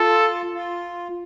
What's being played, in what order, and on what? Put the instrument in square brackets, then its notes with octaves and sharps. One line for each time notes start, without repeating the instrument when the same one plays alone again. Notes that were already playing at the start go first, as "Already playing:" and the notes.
Already playing: [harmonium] F4 [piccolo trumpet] A4
[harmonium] F4